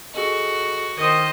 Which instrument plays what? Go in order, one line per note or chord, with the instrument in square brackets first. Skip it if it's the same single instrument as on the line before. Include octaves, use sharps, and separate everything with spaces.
[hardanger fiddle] F#4 [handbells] G#4 A4 D#5
[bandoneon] D#3 D#6 [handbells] A#4 [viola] C5 D#5